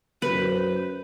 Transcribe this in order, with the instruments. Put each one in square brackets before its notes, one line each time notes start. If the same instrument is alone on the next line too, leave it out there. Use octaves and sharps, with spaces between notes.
[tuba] F#2 [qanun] B4 [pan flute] C5